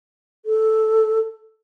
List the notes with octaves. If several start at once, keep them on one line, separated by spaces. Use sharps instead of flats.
A4